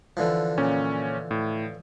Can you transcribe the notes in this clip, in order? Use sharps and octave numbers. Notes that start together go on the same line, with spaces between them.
D3 E3 F3
A#2 C#4
A2